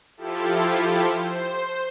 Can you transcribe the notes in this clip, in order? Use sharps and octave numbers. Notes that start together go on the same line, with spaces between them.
F3 E4 F4 G4 A4
C5